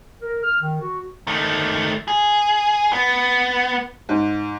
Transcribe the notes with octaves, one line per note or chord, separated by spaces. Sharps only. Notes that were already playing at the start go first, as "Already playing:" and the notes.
A#4
F6
D#3
F#4
D#3 A3
G#4
B3
G#2